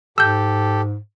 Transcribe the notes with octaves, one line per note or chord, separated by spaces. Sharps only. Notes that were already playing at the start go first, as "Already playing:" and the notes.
G#2 G4 A4 E6 G6